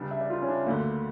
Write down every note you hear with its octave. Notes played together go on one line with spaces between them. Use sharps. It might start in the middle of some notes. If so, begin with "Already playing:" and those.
Already playing: C#2 C#3 G3 D4
E5
D5
F4
C#4
D4
D2 D3 A3 A#3